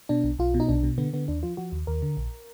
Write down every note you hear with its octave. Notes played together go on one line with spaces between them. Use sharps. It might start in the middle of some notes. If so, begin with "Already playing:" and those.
B2 D4
B1
B1 F4
B2
D#4
B1 D4
B2
D3 B3
D3 B3
D#2 D4
F3 F4
F3 F#4
D#2
D#2 A#4
D3
A#1